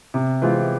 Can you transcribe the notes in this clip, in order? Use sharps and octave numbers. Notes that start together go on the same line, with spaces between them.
C3
E3 G#3 C4 F4